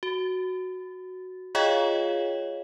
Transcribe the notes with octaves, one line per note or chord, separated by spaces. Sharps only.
F#4
F4 G#4 C#5 D#5 F5 G5